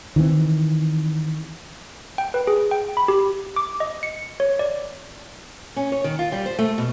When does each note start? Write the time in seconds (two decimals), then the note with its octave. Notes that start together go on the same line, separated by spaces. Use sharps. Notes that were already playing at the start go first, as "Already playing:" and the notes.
0.16 D#3 E3 G#3 C4
2.18 G5
2.34 B4
2.47 G#4
2.71 G5
2.97 B5
3.08 G4
3.56 D6
3.80 D#5
4.03 C#7
4.40 C#5
4.59 D5
5.76 C#4
5.92 C#5
6.04 D#3
6.19 F4
6.32 G3
6.46 C5
6.59 A3
6.78 B2